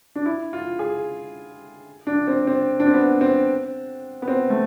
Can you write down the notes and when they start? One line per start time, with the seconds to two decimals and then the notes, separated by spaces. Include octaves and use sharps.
0.16 D4
0.26 E4
0.53 F4
0.79 G#4
2.07 D4
2.28 C4
2.47 C4
2.80 D4
2.87 C4
2.94 B3
3.21 C4
4.22 B3
4.28 C4
4.50 A3